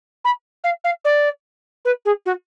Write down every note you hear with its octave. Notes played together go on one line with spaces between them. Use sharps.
B5
F5
F5
D5
B4
G#4
F#4